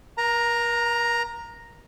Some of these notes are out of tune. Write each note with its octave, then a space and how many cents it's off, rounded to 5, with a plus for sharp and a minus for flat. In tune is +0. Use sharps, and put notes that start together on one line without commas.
A#4 +35 A#5 +0